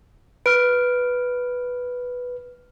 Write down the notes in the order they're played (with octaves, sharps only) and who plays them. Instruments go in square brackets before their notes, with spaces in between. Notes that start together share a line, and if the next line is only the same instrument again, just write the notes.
[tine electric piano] B4 [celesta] F6 D7